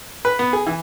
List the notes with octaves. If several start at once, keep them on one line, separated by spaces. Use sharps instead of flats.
B4
B3
G#4
E3